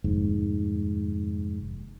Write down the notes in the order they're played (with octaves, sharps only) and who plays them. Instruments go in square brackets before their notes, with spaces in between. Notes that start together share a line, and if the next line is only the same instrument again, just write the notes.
[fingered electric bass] F1 D#2 G#2